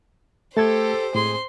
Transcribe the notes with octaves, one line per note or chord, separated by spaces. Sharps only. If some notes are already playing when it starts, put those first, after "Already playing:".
A3 G4 A4 C5 A5 G#6
A2 G#3 C4 G#4 C6